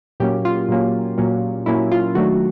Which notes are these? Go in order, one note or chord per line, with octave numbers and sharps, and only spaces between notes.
A#2 F#3 A#3 C#4 G4
F4
A#2 F#3 A#3 C#4
A#2 F#3 A#3 C#4
A#2 F#3 A#3 C#4 E4
F4
D#3 F#3 A3 D4 F#4